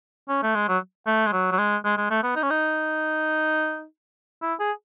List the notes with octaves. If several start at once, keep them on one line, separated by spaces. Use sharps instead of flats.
C#4
A3
G#3
F#3
A3
G#3
F#3
F#3
G#3
G#3
G#3
A3
B3
D#4
C#4
D#4
E4
G#4